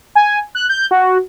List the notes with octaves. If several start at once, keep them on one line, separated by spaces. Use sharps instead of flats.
G#5
F#6
G6
F#4